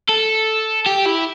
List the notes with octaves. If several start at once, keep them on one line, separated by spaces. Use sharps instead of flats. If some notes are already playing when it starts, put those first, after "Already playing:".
A4
G4
E4